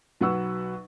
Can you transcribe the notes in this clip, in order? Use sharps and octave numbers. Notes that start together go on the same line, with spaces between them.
B1 F#3 B4 F#5 C#6 E6